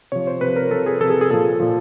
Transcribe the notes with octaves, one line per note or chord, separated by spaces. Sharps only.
C3 F3 C#5
C5
C3 F3 B4
A#4
C3 F3 A4
G#4
C3 F3 A4
G#4
G#4
A#2 F3 A4
A#2 F3